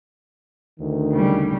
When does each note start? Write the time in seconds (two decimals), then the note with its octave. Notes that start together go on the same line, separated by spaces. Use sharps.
0.80 D2 D#3
1.12 C#3 G3